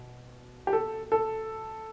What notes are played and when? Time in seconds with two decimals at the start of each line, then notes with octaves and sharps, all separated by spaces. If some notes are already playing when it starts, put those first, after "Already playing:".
Already playing: B2
0.67 G4
0.73 A4
1.12 A4